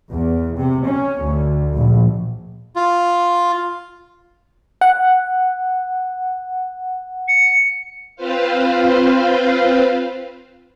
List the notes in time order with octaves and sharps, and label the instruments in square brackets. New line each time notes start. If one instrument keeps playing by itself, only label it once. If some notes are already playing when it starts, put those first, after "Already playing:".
[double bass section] E2
C3
C#4
D2
A#1
[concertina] F4
[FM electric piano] F#5
[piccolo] C#7
[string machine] C4 F4 B4 C5 F5